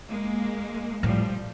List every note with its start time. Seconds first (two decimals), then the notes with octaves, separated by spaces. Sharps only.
0.09 G#3 A#3
1.02 A2 F3 G3